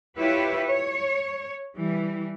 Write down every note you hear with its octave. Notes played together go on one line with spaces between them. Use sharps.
E4 F4 G4 B4 C#5 E5
C#5
E3 G3